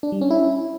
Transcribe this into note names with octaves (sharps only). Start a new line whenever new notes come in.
D4
G3
C#4
E4